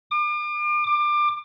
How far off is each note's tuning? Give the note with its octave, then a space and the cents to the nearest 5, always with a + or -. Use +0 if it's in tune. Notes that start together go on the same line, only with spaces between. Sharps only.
D6 +40
D6 +25